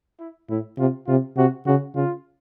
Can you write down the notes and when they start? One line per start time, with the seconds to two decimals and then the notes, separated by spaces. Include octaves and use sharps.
0.20 E4
0.50 A2 E4
0.78 C3 F4
1.07 C3 F4
1.37 C3 F#4
1.66 C#3 F#4
1.95 C#3 F4